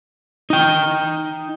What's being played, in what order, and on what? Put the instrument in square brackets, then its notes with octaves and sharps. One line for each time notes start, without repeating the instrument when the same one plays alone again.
[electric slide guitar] D#4 G5